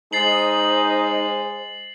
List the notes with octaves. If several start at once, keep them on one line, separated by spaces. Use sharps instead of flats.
G#3 D#4 C5 A6 C7 F#7